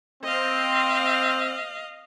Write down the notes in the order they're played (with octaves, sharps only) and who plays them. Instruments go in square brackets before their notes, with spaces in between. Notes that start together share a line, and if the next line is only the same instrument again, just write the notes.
[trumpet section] C4 [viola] D#5 F5